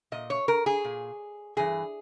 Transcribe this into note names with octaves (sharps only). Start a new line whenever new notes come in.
A#2 D#5
C#5
A#4
G#4
A#2
G2 E3 G#4